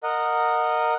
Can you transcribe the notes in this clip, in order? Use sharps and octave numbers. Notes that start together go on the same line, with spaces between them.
A#4 D#5 F#5